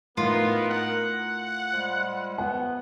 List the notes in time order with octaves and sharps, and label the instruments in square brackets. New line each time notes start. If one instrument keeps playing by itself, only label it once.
[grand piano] A2 [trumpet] B3 [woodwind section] D#4 A#4 [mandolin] F4
[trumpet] F#5
[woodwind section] F3 G3 G#3
[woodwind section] B3 [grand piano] F#5